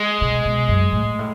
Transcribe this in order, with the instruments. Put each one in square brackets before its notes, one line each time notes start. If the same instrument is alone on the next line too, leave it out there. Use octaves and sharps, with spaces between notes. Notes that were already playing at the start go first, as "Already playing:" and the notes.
Already playing: [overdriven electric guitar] G#3
[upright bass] B2
B2
F#2
A2
A2